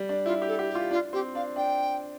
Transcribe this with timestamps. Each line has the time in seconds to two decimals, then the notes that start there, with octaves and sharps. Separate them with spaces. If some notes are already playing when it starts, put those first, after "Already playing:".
Already playing: G3
0.09 D4
0.26 E4 F4
0.42 G4
0.48 A4
0.59 G4
0.70 G4
0.75 F4
0.91 D4 F4
1.13 C4 G4
1.35 D4 F5
1.56 D4 G5